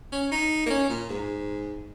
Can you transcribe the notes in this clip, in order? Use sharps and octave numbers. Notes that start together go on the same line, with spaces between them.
C#4
D#4
A#3
C#4
A#2
G#2